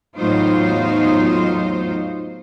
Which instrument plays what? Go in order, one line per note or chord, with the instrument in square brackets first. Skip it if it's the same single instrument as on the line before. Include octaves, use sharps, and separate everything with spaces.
[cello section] E2 A2 F#3 D#4 F4 C5